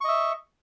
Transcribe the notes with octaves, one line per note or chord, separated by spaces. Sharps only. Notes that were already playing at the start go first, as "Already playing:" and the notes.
D#5 E5 C#6